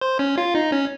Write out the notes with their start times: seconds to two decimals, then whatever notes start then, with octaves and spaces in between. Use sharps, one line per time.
0.01 C5
0.19 C#4
0.38 F4
0.55 D#4
0.72 C#4